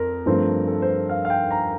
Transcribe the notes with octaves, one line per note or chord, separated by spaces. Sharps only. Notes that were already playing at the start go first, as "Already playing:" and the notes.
Already playing: F2 A#4
G2 F3 A3 C4
A4
C5
F5
F5
G5
A#5